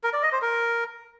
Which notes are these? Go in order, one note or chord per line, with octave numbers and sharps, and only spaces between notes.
A#4
D5
D#5
C5
A#4